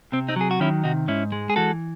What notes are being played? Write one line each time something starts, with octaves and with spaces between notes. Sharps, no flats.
C3 C4
C4 D#4
F#3 G#4
F#4
D#3 C#4 E4
C3 D#4 F#4
G#2 C#4 E4
G#3
G#4
E3 F#4 A4